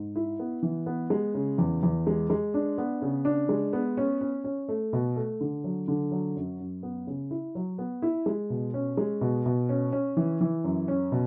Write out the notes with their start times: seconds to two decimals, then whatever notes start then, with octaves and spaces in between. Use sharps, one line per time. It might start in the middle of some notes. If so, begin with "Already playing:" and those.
Already playing: G#2
0.16 E4
0.39 B3
0.62 E3
0.86 B3
1.10 G#3
1.34 C#3
1.58 E2
1.83 E2
2.07 G#3
2.30 G#3
2.54 D4
2.78 B3
3.02 C#3
3.25 D4
3.49 G#3
3.73 B3
3.97 C#4
4.21 C#4
4.44 C#4
4.69 A3
4.93 B2
5.16 A3
5.41 D3
5.64 F#3
5.88 D3
6.12 F#3
6.36 F#2
6.60 F#2
6.83 B3
7.07 C#3
7.31 E4
7.55 F#3
7.78 B3
8.02 E4
8.26 G#3
8.50 B2
8.74 C#4
8.97 G#3
9.21 B2
9.46 B2
9.69 C#4
9.92 C#4
10.17 E3
10.41 E3
10.64 F#2
10.88 C#4
11.12 B2